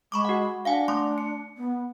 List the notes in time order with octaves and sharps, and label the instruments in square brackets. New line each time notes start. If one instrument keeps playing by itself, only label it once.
[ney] G#3 [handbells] B5 C#6 D6
[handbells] F#4 F#5
[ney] D4 [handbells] F5 F#5 G#5
[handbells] A3 C6 D6
C#7
[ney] B3